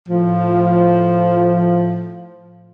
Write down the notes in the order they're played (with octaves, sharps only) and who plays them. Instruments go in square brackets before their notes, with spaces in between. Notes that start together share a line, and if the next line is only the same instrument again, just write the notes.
[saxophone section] A2 F3